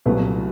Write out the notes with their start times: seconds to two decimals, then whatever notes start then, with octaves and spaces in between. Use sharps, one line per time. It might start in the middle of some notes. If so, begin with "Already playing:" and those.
0.06 C2 A#2 F#3 A3 B3